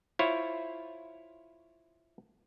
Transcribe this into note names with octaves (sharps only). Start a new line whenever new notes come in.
E4 F4 C5 C#5